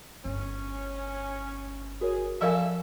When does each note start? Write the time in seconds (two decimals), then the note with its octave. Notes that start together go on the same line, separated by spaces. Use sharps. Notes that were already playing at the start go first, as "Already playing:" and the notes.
0.25 G1 C#4
2.01 F#4 G#4 A#4 C#5
2.41 F3 F#4 A4 A#4 D5 E5 F5 G#5